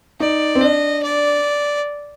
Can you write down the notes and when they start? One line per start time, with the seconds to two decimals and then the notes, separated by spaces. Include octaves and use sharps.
0.20 D#4 D5
0.55 C4
0.61 D4 D#5
1.03 D5